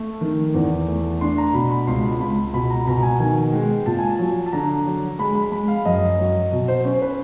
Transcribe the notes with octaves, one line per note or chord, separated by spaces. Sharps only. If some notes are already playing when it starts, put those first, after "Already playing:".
Already playing: A3
D#3
E2
A3
D4 C6
A#5
B2 B5
B5
C#2 C6
C#2 B5
B2 B5
A#5
B2 A#5
G#5
D#3 G#5
G#3 G5
A#2 A5
G#5
A5
F#3
A5
D3 A#5
F#3
G#3 B5
B5
G#3 B5
F5
F#2 D#5
F#3
B2
C5
C#4 C5
B4